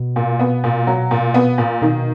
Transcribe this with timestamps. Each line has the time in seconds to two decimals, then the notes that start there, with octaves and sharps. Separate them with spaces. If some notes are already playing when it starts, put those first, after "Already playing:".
Already playing: B2
0.16 A#2
0.40 B3
0.64 A#2
0.87 F#3
1.11 A#2
1.34 B3
1.58 A#2
1.82 B2 D#3